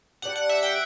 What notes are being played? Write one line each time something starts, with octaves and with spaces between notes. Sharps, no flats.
G3 D4 G4 F#5
F#5
E5
G5